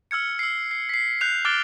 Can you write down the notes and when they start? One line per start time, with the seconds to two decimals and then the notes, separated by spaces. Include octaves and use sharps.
0.11 E6 F6 G#6 C#7
0.39 E6 C7
0.71 C7
0.89 B6 C7
1.21 F#6 G6 C7 F7
1.45 D6 F6 F#6 A6 D7 G7